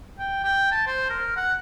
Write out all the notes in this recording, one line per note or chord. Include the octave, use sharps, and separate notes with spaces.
G5
G5
A5
C5
A#4
F#5